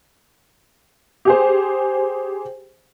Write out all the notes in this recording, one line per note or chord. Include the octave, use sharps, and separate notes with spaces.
G4 G#4 C5